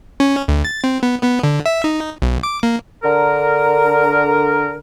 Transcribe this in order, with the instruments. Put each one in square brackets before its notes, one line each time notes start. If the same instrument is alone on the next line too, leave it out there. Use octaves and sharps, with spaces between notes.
[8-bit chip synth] C#4
D2
A6
C4
B3
B3
D3
E5
D#4
B1
D6
A#3
[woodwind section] D3 A#4